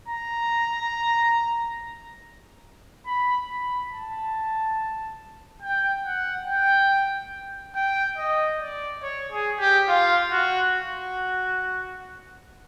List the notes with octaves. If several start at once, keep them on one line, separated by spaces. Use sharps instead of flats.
A#5
B5
B5
A5
G5
F#5
G5
G5
D#5
D5
C#5
G#4
G4
F4
F#4
F#4